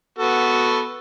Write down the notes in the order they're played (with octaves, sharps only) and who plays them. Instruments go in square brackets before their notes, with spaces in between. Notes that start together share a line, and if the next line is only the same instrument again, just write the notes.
[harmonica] B3 F#4 A4